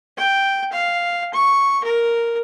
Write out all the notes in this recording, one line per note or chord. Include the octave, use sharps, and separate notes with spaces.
G5
F5
C#6
A#4